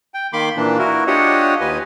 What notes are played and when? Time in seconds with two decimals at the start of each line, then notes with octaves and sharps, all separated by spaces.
0.14 G5
0.33 D#3 A#3 B5 C6 D6
0.57 A#2 E3 A#3 D4
0.79 E4 F#4 A#4
1.07 D4 F4 G4 C#5 D#5 F#5
1.61 D#2 B4 D#5 G#5